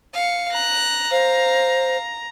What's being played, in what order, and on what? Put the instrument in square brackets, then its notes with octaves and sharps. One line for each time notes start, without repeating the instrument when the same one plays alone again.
[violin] F5 C#7
[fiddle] A#5 [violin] F#6
[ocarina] C5 [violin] F5